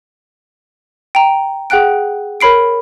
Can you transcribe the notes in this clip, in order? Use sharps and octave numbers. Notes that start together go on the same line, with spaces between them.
G5 A#5
G#4 F#5 G5 F#6 D7
A#4 C#5 B5 C7 D7